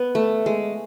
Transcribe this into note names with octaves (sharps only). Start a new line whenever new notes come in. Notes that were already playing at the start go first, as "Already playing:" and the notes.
Already playing: B3
A3
G#3